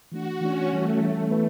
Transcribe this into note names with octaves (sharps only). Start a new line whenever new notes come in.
E3 A3 D4 F#4
E3 A3 C#4 D4
E3 G3 A3 C#4
E3 G3 C#4
E3 B3 E4 B4